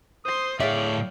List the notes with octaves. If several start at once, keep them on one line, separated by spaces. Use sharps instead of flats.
C5 C6 D#6
A2 G#4 C#5 D5 E5 F5 G5